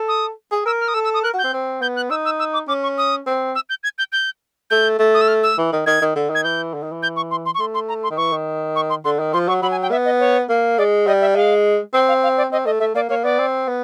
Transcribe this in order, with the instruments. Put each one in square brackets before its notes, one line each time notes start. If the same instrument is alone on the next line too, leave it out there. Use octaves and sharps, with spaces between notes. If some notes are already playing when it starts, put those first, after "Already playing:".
Already playing: [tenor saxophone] A4
[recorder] D#6
[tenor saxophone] G#4
[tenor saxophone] A#4 [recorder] E6
[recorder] F6
D#6
[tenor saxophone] A4 [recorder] E6
[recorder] E6
D#6
[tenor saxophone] A#4 [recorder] F#6
[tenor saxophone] F#4
[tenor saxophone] C4 [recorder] G6
[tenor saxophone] C4
[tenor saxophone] B3 [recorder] G6
[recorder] F#6
[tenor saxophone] D#4 [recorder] E6
[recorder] E6
E6
D6
[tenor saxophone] C#4 [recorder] D6
[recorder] C#6
D#6
[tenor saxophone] C4
[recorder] E6
G6
G#6
G6
G6
[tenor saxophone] A3 [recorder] G6
[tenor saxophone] A3
[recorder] D#6
E6
F6
E6
[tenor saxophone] E3
D#3
[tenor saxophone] D#3 [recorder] G#6
[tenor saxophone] D#3
D3
[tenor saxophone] D#3 [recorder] G#6
[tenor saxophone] E3 [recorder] G6
[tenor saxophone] D3
D#3
E3
[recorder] G6
C#6
C6
C6
C#6
[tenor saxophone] A3 [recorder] C6
[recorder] C6
A#5
C6
[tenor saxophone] D#3
[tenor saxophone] E3 [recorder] C#6
[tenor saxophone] D#3
[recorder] C#6
C6
[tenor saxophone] D3 [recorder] C6
[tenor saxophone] D#3
[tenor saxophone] F3 [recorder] C6
[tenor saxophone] F#3 [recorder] C#6
[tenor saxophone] F#3 [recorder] B5
[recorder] G#5
G5
[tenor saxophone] B3 [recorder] E5
[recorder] D#5
C#5
[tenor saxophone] A#3
[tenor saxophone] G#3 [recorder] D5
[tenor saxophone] G3 [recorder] D#5
[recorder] E5
[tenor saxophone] G#3 [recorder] F5
[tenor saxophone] C4 [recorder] G5
[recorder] F5
F5
D5
[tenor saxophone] C4 [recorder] D#5
[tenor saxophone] A3 [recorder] D#5
[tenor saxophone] A3 [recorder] E5
[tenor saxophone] A#3 [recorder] D5
[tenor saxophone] A#3 [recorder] C#5
[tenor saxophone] B3 [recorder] D5
[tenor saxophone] C4
B3